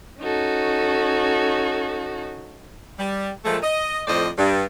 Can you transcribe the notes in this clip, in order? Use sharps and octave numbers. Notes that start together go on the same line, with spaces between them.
C#4 D#4 F#4 A4
G3
A#2 F3 G#3 A3
D#5
F2 A2 F3 C5 D5 D#5
G2